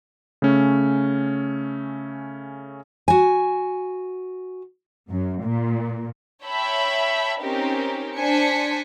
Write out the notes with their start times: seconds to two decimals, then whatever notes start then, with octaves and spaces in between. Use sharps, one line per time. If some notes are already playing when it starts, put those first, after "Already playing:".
0.42 C#3 A3 C#4
3.08 F#4 G#5
5.10 F#2
5.44 A#2
6.45 C#5 E5 G5 A5 B5
7.42 C4 C#4 D#4 G4 A#4
8.17 D4 C5 G#5 B6 C#7